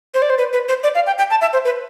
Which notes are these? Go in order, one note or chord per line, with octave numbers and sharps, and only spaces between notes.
C5
D5
C5
B4
B4
C5
D5
F5
G5
G5
A5
E5
C5
B4